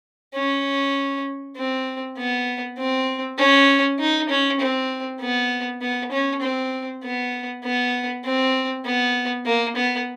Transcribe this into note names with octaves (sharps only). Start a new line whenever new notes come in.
C#4
C4
B3
C4
C#4
D#4
C#4
C4
B3
B3
C#4
C4
B3
B3
C4
B3
A#3
B3